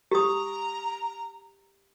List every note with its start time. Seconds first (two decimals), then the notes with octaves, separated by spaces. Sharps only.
0.11 G4 A#5 D#6